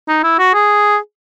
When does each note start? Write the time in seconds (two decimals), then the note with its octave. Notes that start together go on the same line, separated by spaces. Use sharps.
0.08 D#4
0.24 E4
0.39 F#4
0.54 G#4